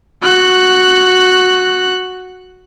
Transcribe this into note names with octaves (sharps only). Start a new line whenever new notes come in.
F#4 F#6